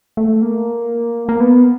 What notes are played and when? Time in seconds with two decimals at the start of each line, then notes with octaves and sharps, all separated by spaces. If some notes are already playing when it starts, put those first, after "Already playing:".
0.17 A3
0.42 A#3
1.29 A#3
1.40 B3